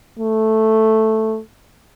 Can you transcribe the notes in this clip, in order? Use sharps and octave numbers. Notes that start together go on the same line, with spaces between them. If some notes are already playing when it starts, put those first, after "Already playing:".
A3